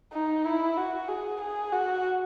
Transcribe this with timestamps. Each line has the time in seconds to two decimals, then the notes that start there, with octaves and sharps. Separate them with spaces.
0.13 D#4
0.45 E4
0.77 F#4
1.09 G#4
1.41 G#4
1.73 F#4